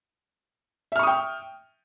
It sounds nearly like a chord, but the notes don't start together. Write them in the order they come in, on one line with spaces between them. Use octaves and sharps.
E5 F6 C#6 D#6 G5